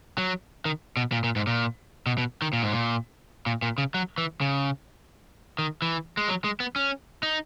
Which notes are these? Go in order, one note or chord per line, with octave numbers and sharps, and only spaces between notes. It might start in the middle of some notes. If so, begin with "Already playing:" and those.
F#3
D#3
B2
A#2
A#2
G#2
A#2
B2
B2
D#3
A#2
G#2
A#2
A#2
A#2
C#3
F#3
E3
C#3
D#3
E3
G#3
F#3
G#3
B3
C#4
D#4